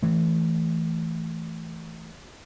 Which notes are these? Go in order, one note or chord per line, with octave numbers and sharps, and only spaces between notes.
E3 A3